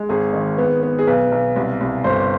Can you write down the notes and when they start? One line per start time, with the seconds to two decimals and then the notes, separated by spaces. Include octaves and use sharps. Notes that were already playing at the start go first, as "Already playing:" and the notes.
Already playing: G#3
0.09 G#1 G#4
0.33 D#3
0.58 B3
0.83 B3
0.99 G#4
1.07 B1 B4
1.32 B1
1.56 C2
1.81 C2
2.04 G1 C5